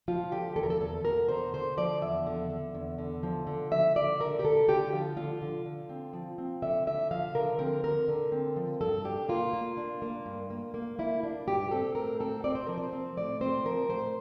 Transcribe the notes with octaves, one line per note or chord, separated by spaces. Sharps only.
F3 F4
D3 G4
E2 A4
A#4
A4
E2 A4
E2 A#4
D3 C5
D3 C5
F3 D5
E2 E5
D3
D3
E2
D3
F3
D3
D3 E5
D3 D5
D3 A#4
G4
D3 A4
D3 G4
F3 F4
D3 F4
D3
D3
C4
F3
C4
D3 E5
D3 E5
F3 F5
D3 A#4
C4 A#4
D3 A#4
D3
C4
F3
G2 A4
D4 G4
A#3 F4
A#3
D4
A#3
G2
A#3
A#3
A#3 E4
D4
G2 G4
C4 A4
A2 A#4
C4 A4
C4 D5
C5
F3 A#4
C5
C4
A2 D5
C4 C5
F3 A#4
A2 C5